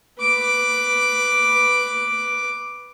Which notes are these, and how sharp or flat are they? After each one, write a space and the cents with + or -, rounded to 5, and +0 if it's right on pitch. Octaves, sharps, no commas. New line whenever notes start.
B4 +0 D6 +0